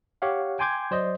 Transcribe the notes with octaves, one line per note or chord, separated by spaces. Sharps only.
G4 C#5 F5 F#5
G5 G#5 C6 D6 G6 G#6
F#3 C5 D5 D#5